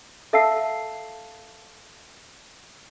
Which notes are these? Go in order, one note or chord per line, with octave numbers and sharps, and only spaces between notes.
A4 E5 F5 A5 E6 C7